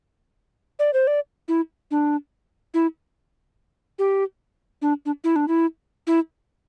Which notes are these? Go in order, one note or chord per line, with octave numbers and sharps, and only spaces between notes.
D5
C5
D5
E4
D4
E4
G4
D4
D4
E4
D4
E4
E4